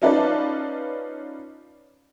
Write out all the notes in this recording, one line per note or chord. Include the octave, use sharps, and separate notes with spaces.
C#4 D#4 F4 B4 D5 A5